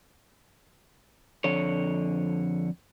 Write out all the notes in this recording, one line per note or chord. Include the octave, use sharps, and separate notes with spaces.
F2 D3 C#5